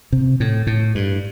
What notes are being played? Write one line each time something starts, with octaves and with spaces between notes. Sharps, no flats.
C3
A2
A2
G2